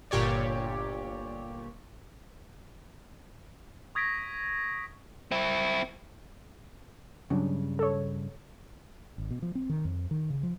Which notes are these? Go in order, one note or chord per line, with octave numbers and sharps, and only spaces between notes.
G1 A#2 G4 C#5 D5
C#6 D#6 G#6 A#6 B6 D7
C4 E4
G2 C#3 F#3 D4
A4 C#5
G#1
B2
F3
C4
D#3
F2
D#3
C#3
F3